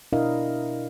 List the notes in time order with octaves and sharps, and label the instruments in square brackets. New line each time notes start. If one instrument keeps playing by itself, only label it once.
[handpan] B2 D4 E4 A#4 D#5 F5